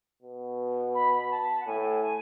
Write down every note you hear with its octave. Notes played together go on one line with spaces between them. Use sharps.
B2
B5
A5
F#5
A2 G#5